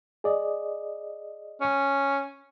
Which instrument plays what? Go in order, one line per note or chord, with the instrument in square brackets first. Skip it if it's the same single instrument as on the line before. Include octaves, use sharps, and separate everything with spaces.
[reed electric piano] G#4 D5 D#5
[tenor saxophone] C#4